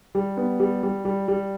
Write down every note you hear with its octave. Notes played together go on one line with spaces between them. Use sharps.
G3
B3
G3
G3
G3
G3